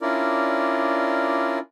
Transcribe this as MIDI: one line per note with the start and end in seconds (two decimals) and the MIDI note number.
0.01 1.59 61
0.01 1.59 62
0.01 1.59 64
0.01 1.59 65
0.01 1.59 70
0.01 1.59 74